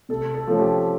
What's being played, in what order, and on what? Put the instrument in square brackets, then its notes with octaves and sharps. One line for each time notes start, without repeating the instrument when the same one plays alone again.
[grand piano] C3 A4
A4
F3 A3 C#4
G4